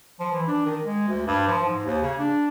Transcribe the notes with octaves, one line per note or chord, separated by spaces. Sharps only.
F3
E3
D4
D#3
G#3
D2
G2
F3
G#2
D#2
C#3
D4